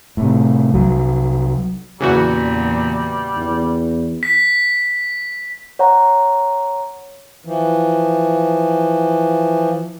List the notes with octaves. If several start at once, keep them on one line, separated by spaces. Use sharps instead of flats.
A2 C3
C2 F#3
E2 A#2 C#3 E3 G3 F#4
E2
B6
C#5 F#5 A#5
E3 F3